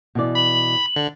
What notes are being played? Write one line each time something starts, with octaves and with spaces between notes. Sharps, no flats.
B2 E3 D5
B5 F#7
D3